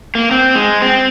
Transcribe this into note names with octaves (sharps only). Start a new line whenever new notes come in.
A#3
C4
G#3
C4